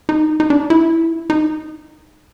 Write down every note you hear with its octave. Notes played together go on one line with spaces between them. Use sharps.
D#4
D#4
D4
D#4
E4
D#4